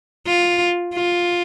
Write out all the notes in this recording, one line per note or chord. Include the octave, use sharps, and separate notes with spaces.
F4
F4